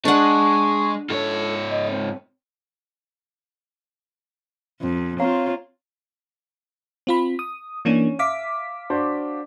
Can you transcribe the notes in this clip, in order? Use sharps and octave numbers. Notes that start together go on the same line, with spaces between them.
G#3 D4 F#5 C#6
G#2 A4 C#5
D#5
C4
F2
C4 F4 C#5 F5 A#5
C4 F4 B5
D#6
E3 A#3 C#4 D4 D#7
E5 F5 D6 B6
D4 F#4 C5